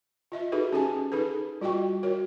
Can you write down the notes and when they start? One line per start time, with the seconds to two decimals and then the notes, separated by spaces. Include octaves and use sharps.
0.32 F4 D#5 E5
0.52 D#4 F#4 G#4 A4 B4
0.73 C#4 G4 G#4 G#5 A5
1.12 D#4 G#4 A4 B4
1.61 G3 F4 F#4 D#5 G5 C#6
2.03 F#4 A#4 C#5